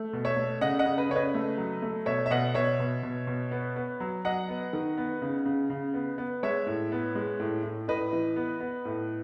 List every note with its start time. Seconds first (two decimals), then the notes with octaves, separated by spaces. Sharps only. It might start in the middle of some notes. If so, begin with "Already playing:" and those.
Already playing: A3
0.13 B2
0.25 C#5 E5
0.36 A3
0.61 C#3 D#5 F#5
0.79 D#5 F#5
0.85 C#3
0.97 B4 D#5
1.09 C#3 C#5
1.15 B4 D#5
1.34 A3
1.58 F#3
1.82 A3
2.06 B2 C#5 E5
2.26 E5
2.31 B2 D#5 F#5
2.54 B2 C#5 E5
2.79 B2
3.03 B2
3.27 B2
3.51 B3
3.76 B3
4.00 F#3
4.25 F#3 D#5 F#5
4.49 B3
4.73 D#3
4.98 B3
5.22 C#3
5.46 C#3
5.70 C#3
5.94 B3
6.18 B3
6.43 G#3 C#5 E5
6.67 A2
6.92 B3
7.15 G#3
7.40 A2
7.63 A2
7.88 A2 B4 D#5
8.13 E3
8.36 B3
8.61 B3
8.85 A2